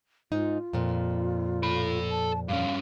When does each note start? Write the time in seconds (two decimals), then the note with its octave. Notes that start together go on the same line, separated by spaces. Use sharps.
0.32 G#2 D#4 F4
0.73 F2 A#2
1.63 A4 B5
2.09 A5
2.48 G2 C#4 F5